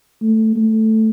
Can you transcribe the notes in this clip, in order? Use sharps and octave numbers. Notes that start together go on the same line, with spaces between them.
A3
A3